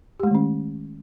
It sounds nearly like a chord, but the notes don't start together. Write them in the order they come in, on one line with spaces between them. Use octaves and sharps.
G4 G#3 A3 D#3 C#4